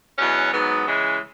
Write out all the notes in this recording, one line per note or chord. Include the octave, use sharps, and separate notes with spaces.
E2 B2 F#3 C#4
G#2 F#3 B3
C#3 E3 G#3